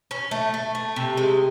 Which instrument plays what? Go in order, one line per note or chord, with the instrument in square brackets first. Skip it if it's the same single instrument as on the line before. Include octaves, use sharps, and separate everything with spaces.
[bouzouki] C#4
A3
A3
A3
C3
G#3